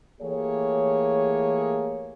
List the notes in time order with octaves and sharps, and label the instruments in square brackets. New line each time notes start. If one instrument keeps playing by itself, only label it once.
[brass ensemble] E3 A3 A#3 G4 G#4 C#5